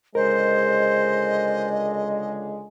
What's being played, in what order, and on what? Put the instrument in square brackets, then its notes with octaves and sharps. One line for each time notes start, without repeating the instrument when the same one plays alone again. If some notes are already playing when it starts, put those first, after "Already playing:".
[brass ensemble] C#2 D3 G#3 [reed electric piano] A#4 [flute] C5 [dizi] D#5